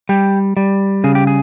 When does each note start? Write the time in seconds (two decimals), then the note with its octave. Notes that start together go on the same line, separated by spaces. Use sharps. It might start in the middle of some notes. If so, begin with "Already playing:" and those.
0.09 G3 G4
0.57 G3
1.04 C#3 G#4
1.15 G4
1.27 G#4